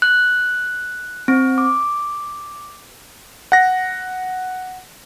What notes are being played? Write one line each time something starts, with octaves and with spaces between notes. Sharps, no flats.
F#6
C4
D6
F#5 A#6